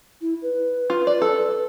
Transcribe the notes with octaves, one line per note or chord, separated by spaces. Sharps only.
E4
B4
F4
D5
A4